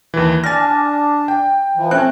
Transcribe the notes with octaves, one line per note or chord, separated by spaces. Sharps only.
D#2 E3
D4 G#5 F6 A6 A#6
G5
E3 F3
A3 C4 C#4 F#6